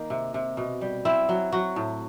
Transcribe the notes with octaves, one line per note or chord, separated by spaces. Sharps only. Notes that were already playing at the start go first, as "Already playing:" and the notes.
Already playing: D#3 A#3
C3
C3
B2
G3
C4 E4
F#3
F#3 F#4
A2